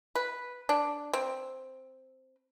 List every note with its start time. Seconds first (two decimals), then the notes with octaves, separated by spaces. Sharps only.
0.15 B4
0.69 D4
1.13 C4